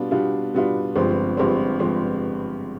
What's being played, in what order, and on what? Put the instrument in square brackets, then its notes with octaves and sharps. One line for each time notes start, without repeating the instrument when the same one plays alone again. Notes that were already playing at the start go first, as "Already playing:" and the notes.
Already playing: [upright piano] B2 G3 B3 D4 F4
B2 G3 B3 D4 F4
B2 G3 B3 D4 F4
G1 G2 F3 G#3 C4
G1 G2 F3 G#3 C4
F3 G#3 C4